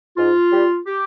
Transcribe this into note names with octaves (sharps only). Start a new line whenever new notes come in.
G#2 F4
G3
G4